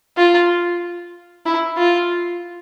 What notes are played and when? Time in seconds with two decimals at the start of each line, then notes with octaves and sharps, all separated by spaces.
0.17 F4
1.46 E4
1.77 F4